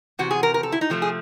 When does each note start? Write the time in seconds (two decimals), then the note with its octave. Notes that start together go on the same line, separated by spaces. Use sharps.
0.19 E2 C3 F#4
0.31 G#4
0.43 A#4
0.54 A#4
0.63 A4
0.72 E4
0.81 D#4
0.90 C3 F3 A3 C4
1.02 G#4